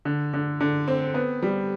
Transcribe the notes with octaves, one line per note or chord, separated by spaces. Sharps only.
D3
D3
D3
C4
B3
G3